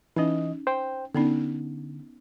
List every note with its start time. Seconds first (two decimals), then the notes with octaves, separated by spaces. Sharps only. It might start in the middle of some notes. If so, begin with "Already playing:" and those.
0.16 E3 C#4 D#4 D#5
0.67 C5 G5
1.15 D3 B3 C#4 D#4